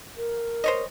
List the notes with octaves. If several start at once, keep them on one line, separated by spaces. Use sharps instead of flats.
A#4
C5 C#5 D#5